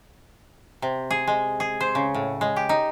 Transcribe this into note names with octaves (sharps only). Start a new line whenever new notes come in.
C3
G#4
G#3
G#4
C5
C#3
A2
G#3
G4
D#4